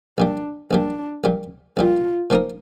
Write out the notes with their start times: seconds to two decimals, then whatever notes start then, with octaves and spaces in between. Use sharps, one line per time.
0.18 A#1 A#2 G3 D4
0.71 A#1 A#2 G3 D4
1.24 A#1 A#2 G3
1.77 A#1 A#2 G3 F4
2.30 A#2 F3 A#3 D#4 A#4